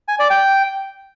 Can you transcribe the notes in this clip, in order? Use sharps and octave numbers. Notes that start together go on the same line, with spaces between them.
G#5
D5
G5